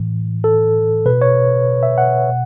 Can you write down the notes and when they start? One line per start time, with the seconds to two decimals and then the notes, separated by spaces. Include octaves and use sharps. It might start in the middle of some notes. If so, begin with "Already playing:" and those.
Already playing: A2 E3
0.44 A4
1.06 B2 B4
1.22 C#5
1.83 E5
1.98 F#5
2.29 B2